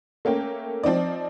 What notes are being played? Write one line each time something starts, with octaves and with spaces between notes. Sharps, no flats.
A3 A#3 C#4 G5
F3 C4 D#4 D5